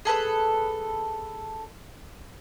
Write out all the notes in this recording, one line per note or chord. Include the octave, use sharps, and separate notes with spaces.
G#4 A4 B4 D#6